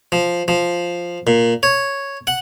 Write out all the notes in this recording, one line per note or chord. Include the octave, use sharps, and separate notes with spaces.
F3
F3
A#2
C#5
F#5